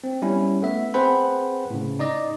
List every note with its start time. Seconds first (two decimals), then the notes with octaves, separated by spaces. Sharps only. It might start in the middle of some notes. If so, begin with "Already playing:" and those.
0.04 C4
0.22 G3 B3 C#4 E4
0.62 A3 B3 E5
0.94 C4 G#4 B4 C5 F#5 B5
1.70 A2 C#3
1.99 D#4 D5 D#5